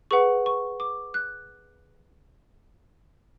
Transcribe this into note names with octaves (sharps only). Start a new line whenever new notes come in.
G#4 B4 F#5 C#6
C#6
D6
F#6